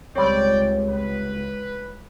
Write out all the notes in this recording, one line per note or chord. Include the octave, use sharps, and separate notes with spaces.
C#2 G3 C4 C#5 D5 G5
B4